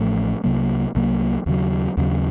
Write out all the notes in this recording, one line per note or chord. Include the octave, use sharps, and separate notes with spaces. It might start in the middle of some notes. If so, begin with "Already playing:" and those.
Already playing: A1 A2 F3 A3
C2 C3 F#3 A#3
C2 C3 F#3 A#3
D#2 C#3 F#3
D#2 C#3 F#3